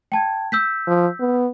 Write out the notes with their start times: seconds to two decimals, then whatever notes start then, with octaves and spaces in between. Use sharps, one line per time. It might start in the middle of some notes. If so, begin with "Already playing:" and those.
0.12 G5 A5 G#6
0.52 E6 G6 B6
0.87 F3
1.20 B3